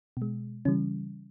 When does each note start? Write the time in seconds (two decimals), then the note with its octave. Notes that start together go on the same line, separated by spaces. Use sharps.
0.17 B2 G#3
0.65 C#3 E3 G3 C#4